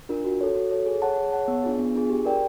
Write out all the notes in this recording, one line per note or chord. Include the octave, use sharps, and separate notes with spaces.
D4 F4 A#4
F#4
A4 C#5
F#4
A4 C#5
G#4
C#5 F#5 A5
G#4
C#5 F#5 A5
B3
D4 F4 G#4
B3
D4 F4 G#4
G4
A#4 D5 G5